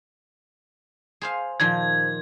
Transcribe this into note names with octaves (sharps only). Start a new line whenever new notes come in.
G#4 C5 F5
A#2 D#3 F3 G#6